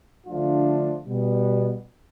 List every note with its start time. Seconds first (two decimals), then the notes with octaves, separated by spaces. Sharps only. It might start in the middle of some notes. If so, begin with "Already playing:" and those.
0.26 D3 F3 A3 D4 F4
1.06 B2 G3 B3